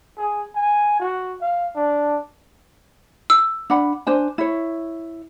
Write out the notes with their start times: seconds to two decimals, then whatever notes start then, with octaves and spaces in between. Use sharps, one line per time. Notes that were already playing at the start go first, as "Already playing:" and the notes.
0.17 G#4
0.55 G#5
1.00 F#4
1.41 F5
1.76 D4
3.30 E6
3.70 D4 F#5 B5
4.07 D4 C5 G#5
4.38 E4 C#5